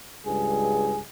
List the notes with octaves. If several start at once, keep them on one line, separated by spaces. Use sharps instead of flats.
C#2 G2 G#4